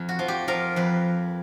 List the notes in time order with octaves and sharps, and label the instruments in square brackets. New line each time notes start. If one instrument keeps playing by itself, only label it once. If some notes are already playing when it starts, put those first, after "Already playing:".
Already playing: [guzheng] F2
F#4
F3
G4
F3 A#4
F2 B4